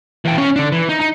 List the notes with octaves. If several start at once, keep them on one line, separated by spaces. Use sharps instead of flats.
E2 G5
C#4 F5
D3 D4
E3
D#4
D#4